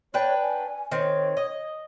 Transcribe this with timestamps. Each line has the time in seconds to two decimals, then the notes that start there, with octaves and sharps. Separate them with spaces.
0.14 D4 B4 C#5 G5
0.41 G#5
0.91 D#3 C4 C#5
1.37 D#5